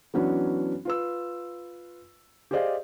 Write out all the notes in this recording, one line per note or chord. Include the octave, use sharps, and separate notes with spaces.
E3 F#3 B3 C#4 D4 F#4
F4 B4 E6
G4 G#4 C5 D5 D#5 F5